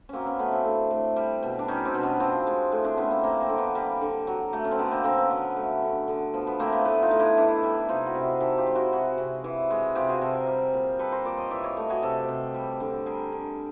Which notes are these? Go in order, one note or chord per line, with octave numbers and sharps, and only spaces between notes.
F#3 A#3 C4 C#4
B3 C#4
A3 B3 C#4
C4 D4
A2
A2
G3
B2
D4
G3 C#4 D#4
C4 D4
B2
B3 C#4
F3 C4 D4
G#3
A2
C4 D4
A2 B3 C#4
A#3 C4
G3 A#3 C4
A#3 C4
D3
B3
G3 A#3
D3
F#3
A3
C#4
C4
D3 B3
A#3 C4
D3 A#3 C4
B3 C#4
F#3 B3 C#4
A3
D3
D3
F3 B3
B3
A3 A#3 C4
B3
A2 B3
D#4 F4
A2
D4 E4
E3 D4 E4
G3
C3 D#4 F4
E4 F#4
C3
F#4 G#4
D#3 G4 A4
F4 G4
G#3
E4 F#4
C3 F#4 G#4
C3
E3
G#3
C3 F4 G4
F#4 G#4
C3 G4 A4
G#4 A#4
G3
A#2
G3 A4 B4
A#4 C5
A#2 C5 D5
C#5 D#5
E3 D5 E5
C#5 D#5
A3
F#4 G#4
C3 G4 A4
C3
G3
D3
G3 G#4 A#4
D3